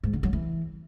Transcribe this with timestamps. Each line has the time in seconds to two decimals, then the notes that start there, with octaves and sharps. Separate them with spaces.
0.04 G#2
0.13 D3
0.23 F#3
0.33 E3